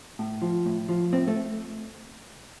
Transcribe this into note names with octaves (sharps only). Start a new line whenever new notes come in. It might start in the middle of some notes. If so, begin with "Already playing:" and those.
A2
F3
A2
F3
A2 C4
A3